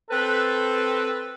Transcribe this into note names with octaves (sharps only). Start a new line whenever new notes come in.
C4 A4 B4